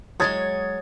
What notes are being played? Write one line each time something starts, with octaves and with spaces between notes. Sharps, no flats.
F#3 G#3 C#5 D#6 G#6 A6